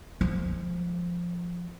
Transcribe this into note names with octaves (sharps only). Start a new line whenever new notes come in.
F3 G#3